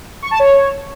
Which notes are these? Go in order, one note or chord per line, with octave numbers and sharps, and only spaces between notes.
C#6
A5
C#5